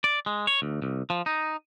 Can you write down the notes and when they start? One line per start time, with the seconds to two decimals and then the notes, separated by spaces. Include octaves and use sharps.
0.04 D5
0.26 G#3
0.47 C#5
0.62 D2
0.82 C2
1.10 F3
1.26 D#4